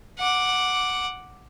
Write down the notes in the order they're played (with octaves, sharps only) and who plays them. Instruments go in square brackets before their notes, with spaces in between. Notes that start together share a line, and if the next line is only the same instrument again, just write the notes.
[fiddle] F#5 D6